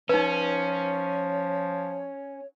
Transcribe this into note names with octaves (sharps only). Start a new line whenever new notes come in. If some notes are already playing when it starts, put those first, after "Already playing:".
F3 C#4 D#4 B4 C#5